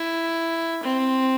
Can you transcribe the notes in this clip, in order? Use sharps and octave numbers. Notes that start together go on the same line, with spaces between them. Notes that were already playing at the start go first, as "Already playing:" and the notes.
Already playing: E4
C4